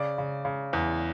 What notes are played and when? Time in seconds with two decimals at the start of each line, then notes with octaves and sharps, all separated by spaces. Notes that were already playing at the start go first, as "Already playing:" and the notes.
Already playing: C#3 D5
0.18 C#3
0.45 C#3
0.73 E2